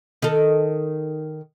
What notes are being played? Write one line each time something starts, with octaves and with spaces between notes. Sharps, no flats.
D#3 A4